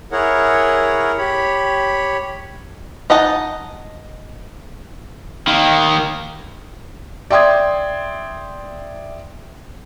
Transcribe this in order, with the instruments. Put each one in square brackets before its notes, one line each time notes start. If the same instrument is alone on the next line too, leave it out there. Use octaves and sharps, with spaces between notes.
[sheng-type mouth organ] E4 G#4 A#4 C#5 F#5
G4 C#5 B5
[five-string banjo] D#4 D#5 F#5 A5
[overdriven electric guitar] D#3 A#3
[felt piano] D5 E5 G5 C6 D#6 G#6